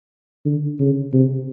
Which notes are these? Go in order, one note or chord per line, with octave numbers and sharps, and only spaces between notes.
D3
C#3
C3